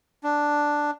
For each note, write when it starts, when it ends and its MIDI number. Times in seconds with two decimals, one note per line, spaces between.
0.23 0.91 62